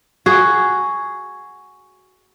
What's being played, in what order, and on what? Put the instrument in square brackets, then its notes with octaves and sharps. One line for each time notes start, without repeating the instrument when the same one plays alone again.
[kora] F#4 G#4